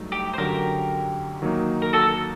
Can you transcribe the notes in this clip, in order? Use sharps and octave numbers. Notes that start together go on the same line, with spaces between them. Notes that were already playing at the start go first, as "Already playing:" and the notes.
Already playing: G2 F#3 A3 D#4
G4
C5
F#2 D3 F#3 G4 A#4
D#3 F#3 A#3 D#4
A#4
F#4 A4